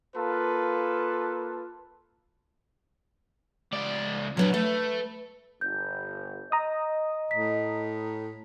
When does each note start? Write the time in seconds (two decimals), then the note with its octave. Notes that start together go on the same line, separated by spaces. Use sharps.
0.15 A#3 F4 A4 B4 A5
3.73 C#2 D5
4.37 A#2 F#3 B3 D4 F#5
4.54 A3 B4
5.61 G1 G6
6.52 D#5 A#5 D#6
7.31 A2 B6